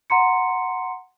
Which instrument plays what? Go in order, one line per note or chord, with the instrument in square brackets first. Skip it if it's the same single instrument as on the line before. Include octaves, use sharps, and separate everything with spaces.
[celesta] F#5 A#5 C6 C#7